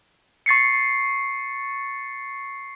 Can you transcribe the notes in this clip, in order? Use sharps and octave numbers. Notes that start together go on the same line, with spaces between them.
C#6 A6 C7 C#7